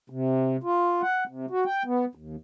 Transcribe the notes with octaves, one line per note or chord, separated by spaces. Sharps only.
C3
F4
F#5
C3
F#4
G5
B3
D#2